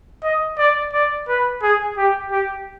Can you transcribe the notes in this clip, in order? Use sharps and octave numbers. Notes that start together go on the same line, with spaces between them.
D#5
D5
D5
B4
G#4
G4
G4